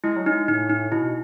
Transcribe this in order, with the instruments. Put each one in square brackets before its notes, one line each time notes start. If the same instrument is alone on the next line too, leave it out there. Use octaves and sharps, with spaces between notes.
[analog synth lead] G#3 [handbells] E4
[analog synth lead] F#3
[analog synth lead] G#3 [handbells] D#4
[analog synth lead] A2 [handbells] D#4
[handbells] D#4
[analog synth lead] B2 [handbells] E4